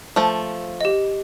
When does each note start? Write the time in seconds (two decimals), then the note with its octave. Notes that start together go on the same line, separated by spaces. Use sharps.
0.16 F3 A3
0.81 G4 D#5